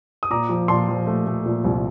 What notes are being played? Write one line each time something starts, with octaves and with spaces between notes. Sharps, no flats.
D#6
A#2 A#5 D6
F3
A#2 A5 C6
F3
A3
A3
A#2
C2